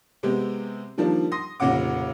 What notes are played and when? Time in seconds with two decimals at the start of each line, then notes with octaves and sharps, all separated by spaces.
0.23 C3 G#3 B3 C4 G4
0.98 D#3 F3 G3 A#3 D4
1.32 C6 D#6 A#6
1.60 F1 A#2 C#3 F#5 D6